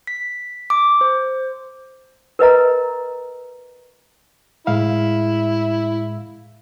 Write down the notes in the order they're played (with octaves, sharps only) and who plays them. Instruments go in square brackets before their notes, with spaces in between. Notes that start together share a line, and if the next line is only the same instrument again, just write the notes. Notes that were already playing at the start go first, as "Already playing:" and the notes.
[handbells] B6
D6
C5
[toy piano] A#4 B4 D#5 A#5
[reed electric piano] A2 G#3 F5 [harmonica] E4